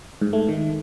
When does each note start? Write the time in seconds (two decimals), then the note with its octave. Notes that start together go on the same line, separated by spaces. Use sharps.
0.21 G#2
0.33 A3
0.48 D#3